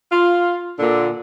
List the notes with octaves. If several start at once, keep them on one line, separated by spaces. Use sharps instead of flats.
F4
A#2 D3